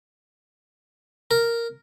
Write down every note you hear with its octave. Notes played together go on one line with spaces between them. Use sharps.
A#4